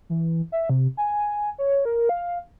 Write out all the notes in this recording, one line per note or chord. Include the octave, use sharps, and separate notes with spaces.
E3
E5
C3
G#5
C#5
A#4
F5